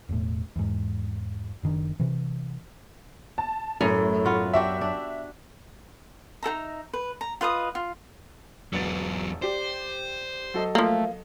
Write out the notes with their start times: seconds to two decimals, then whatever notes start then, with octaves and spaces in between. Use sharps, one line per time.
0.09 E1 A2
0.56 E2 G#2
1.63 F#1 D#3 D4
2.00 C3 E3
3.38 A5
3.81 F#2 A2
4.25 B3 F4 F#4
4.54 D4 F#4 G4 E5
4.81 D4
6.43 D#4 A4 E5 A#5
6.93 B4
7.21 A#5
7.41 F4 B4 D#5 D#6
7.75 F4
8.73 E1 E2 F#3 B3 A6
9.42 G4 C5 D5
10.54 F#3 A4 D#5
10.75 F3 A3 A#3